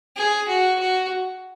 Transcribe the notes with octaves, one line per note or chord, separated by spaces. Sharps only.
G#4
F#4
F#4